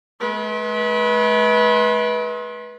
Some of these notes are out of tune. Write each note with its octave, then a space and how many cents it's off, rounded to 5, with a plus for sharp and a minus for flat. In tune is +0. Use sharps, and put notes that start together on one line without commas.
G#3 +45 B4 -20